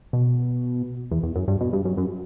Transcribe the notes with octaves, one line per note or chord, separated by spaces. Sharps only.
B2
E2
E2
F#2
G2
B2
G2
F#2
F#2